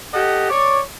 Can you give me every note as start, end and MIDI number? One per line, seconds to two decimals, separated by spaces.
0.14 0.50 67
0.14 0.50 69
0.14 0.50 75
0.14 0.50 78
0.50 0.80 73
0.50 0.80 74